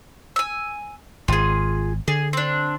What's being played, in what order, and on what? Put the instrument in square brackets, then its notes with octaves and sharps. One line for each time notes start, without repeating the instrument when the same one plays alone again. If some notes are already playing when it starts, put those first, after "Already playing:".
[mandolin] G#5 E6
[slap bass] G#1 [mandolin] F4 G#4
[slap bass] D3 [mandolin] G#4
[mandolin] C4 D4